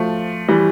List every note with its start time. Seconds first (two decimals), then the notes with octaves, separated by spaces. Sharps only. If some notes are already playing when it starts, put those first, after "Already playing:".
Already playing: F3 A3
0.49 E3 G3